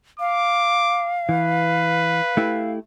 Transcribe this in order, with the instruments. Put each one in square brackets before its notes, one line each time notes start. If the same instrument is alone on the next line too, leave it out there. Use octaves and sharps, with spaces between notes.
[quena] F5 [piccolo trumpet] D6
[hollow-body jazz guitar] E3 [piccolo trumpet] B4
[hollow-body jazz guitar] A3 E4 G4